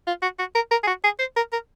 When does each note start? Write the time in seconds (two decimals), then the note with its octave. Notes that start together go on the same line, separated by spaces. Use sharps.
0.07 F4
0.22 F#4
0.39 F#4
0.55 A#4
0.71 A#4
0.83 G#4
0.87 F#4
1.04 G#4
1.19 C5
1.36 A#4
1.52 A#4